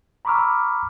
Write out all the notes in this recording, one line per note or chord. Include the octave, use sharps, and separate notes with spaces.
A#5 B5 C#6 D6 E6 F6